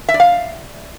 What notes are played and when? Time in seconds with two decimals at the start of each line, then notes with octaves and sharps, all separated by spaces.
0.09 E5
0.14 D5
0.20 F5